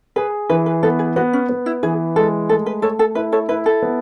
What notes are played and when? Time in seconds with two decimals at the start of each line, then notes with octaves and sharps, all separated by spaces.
0.16 G#4 B4
0.49 E3 B4
0.66 B4
0.83 B3 A4
0.99 G#4
1.16 B3 F#4
1.33 C#4
1.49 B3
1.66 E4
1.83 E3 G#4
2.16 G#3 A4
2.49 A3 A4
2.66 B4
2.82 A3 A4 C#5
2.99 A4
3.15 E4 B4
3.32 A4 C#5
3.49 E4 B4
3.66 A4
3.82 B3